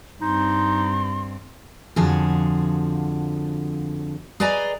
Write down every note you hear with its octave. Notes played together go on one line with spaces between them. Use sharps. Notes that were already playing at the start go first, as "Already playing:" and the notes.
G2 C4 D#4 C6
F2 D3 F3 F#4 G#4
G#4 B4 D5 D#5 G#5 A#5